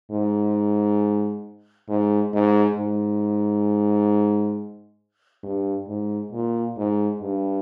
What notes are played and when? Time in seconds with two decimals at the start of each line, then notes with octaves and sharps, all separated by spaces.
0.11 G#2
1.89 G#2
2.33 G#2
2.77 G#2
5.43 G2
5.87 G#2
6.32 A#2
6.77 G#2
7.21 G2